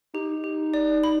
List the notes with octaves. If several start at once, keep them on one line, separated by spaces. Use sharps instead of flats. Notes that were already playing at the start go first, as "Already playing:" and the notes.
D#4 G4
G4
D5
B5